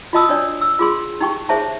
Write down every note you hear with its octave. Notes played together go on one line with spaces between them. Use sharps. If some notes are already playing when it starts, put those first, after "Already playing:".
F4 F#4 D#5 A5 D#6 E6
D4 C#5 D5
E6
F4 G#4 C6
D#4 G4 G5 C#6
G#4 C5 C#5 E5 A5